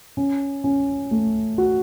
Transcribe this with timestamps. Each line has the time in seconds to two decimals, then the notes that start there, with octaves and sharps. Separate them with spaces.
0.17 C#4
0.64 C#4
1.11 A3
1.58 F#4